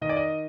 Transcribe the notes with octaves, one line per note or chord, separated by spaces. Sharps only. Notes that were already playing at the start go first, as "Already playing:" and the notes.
D#3 D#5
D5
D#5